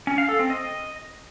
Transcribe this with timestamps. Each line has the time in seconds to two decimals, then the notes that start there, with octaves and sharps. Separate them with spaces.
0.07 C#4
0.18 F5
0.29 A4
0.39 C4
0.50 D#5